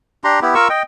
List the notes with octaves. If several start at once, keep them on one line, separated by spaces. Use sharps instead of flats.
D4 G4 A#5 C6
B3 E4 G4
F4 A#4 C#6 E6
D#5 G5